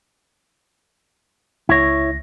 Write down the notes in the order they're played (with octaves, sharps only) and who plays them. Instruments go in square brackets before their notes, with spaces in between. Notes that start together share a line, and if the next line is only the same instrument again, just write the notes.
[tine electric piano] C#2 A#6 [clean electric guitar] E4 C#5